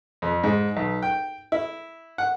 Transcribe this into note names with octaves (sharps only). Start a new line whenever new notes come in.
F2
G#2
B1
G5
E4
F#5